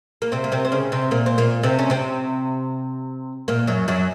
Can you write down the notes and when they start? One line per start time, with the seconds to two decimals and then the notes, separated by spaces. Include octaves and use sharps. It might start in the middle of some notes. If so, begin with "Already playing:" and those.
0.22 A#3
0.32 C3 C4
0.44 A#3
0.52 C3 C4
0.65 C4
0.72 C#3 C#4
0.92 C3 C4
1.11 A#2 A#3
1.26 C4
1.38 A#2 A#3
1.63 C3 C4
1.79 C#4
1.90 C3 C4
3.48 A#2 A#3
3.67 F#2 F#3
3.88 F#2 F#3